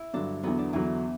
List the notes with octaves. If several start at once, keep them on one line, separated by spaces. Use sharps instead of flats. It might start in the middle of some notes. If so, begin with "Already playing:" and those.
Already playing: E4
G2 D3 F#3 D4
E2 D3 F#3 B3
D4
E2 D3 E3 F#3